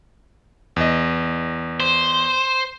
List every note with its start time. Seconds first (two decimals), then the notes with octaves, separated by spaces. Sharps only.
0.76 E2 D#5
1.80 C5